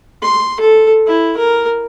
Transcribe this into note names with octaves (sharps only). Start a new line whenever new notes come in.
C6
A4
E4
A#4